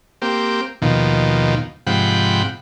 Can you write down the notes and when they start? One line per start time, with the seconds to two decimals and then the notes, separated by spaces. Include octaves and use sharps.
0.22 A#3 C4 G4
0.82 D#2 B2 D#3 F3
1.87 G#2 C3 F3 F#5 G5 B5